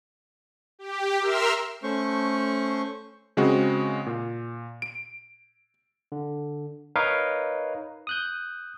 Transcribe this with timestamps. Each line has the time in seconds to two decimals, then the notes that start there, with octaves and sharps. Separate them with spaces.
0.79 G4
1.20 A#4 E5 C6 E6 F6
1.83 A3 C#4 C5 C#6
3.37 C#3 G#3 C4 F#4
4.06 A#2
4.82 D7
6.12 D3
6.96 D#4 A#4 B4 C#5 D#5 F5
8.07 D#6 F#6 G6